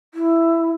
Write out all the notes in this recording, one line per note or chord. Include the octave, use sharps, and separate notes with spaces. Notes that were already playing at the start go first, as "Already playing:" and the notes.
E4